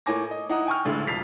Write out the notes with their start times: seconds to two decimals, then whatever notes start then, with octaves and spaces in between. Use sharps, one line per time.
0.06 A2 A#3 C#5 G#5 D6 A#6
0.31 D#5
0.49 D#4 E4 D#5 F#5 A#5 D#6
0.66 G5 G#5 C#6 F6
0.85 A1 D2 D3 G#3
1.07 E1 F2 A6 B6 C7 F7